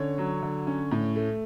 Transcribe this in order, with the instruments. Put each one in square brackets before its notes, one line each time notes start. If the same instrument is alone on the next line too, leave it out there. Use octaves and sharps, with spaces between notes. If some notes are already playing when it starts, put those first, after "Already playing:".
Already playing: [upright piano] D3 C#4 C#5
F#3
D3
C#4
A2
A3